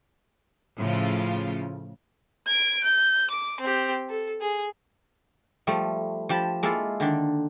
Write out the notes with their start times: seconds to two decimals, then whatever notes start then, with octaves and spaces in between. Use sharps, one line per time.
0.79 A2 C#3 F3 F4
2.47 G#6 D7
2.84 G6
3.31 D6
3.61 C4 G4
4.10 A4
4.41 G#4
5.67 F3 G3 A3
6.29 F3 G4 A5 B5
6.63 G#3 A#3 E4 F4 A4
7.00 D3 D#3 D4